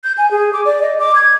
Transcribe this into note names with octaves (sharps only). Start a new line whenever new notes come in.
G6
G#5
G#4
D6
D5
D#5
D6
G#6